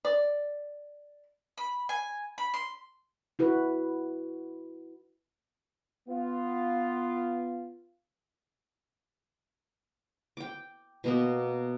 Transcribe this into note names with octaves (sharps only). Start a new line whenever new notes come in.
D5
B5
G#5
B5
C6
E4 F#4 B4
B3 F4
G5 D6
B2 A#3 B3